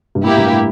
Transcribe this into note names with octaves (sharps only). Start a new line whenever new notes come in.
G2
A2 A#3 E4 G4
G2
A2